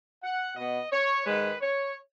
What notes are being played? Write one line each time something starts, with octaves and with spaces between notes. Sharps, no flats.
F#5
B2 B3 D#5
C#5
G#2 D#3 G#3 B4
C#5